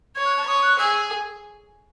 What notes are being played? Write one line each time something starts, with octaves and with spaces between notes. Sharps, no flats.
C#5 G#6
F#6
A5
C#5 D#6
F#6
G#4 E6